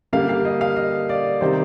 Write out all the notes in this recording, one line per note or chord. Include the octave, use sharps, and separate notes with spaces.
D3 G3 A#3 F5
F5
D#5
F5
D#5
D5
C3 D#3 G3 C5